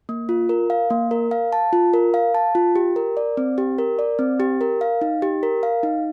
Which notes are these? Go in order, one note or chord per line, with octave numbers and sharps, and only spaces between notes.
A#3
F4
A#4
F5
A#3
A#4
F5
A5
F4
A#4
F5
A5
F4
G4
A#4
D5
C4
G4
A#4
D5
C4
G4
A#4
F5
D#4
G4
A#4
F5
D#4